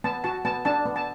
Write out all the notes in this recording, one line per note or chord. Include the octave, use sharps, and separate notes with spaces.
B3 A5
F#4 A5
B3 A5
D4 A5
B3
A5